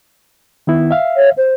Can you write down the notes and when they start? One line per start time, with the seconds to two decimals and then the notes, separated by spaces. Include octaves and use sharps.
0.67 D#3 B3 E4
0.91 E5 F5
1.16 C#5
1.37 C5